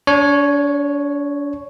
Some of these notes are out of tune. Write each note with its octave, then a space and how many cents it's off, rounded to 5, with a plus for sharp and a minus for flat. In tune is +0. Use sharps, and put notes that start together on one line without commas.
D4 -40 C#5 +0